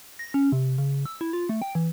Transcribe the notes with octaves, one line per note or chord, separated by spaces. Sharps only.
A#6
C#4
C3
C#3
E6
E4
F4
A3
G5
E3